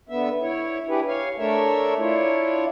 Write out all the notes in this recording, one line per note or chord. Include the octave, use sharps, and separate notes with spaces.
D3 B3 E5
E4 C#5
D4 E4 G4 G#4 B4
C#5 F5 G#5
A3 D4 A#4 C#5 E5
D4 E4 F4 C#5